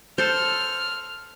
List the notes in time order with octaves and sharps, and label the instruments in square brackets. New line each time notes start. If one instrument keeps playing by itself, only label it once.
[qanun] A4 C5 [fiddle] F6